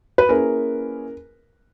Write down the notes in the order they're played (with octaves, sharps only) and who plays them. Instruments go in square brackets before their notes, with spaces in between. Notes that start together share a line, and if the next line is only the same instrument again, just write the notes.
[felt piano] B4
[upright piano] A#3 C#4 E4 G#4 B4 [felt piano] A#4